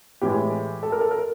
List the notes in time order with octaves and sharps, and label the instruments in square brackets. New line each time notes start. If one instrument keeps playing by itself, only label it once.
[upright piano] A2 E3 G#3 G4
A4
A#4
A4
A#4